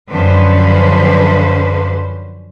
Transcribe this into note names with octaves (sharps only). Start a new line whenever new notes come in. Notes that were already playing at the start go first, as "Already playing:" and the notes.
F#2 D3 F3 C#4 B4 C5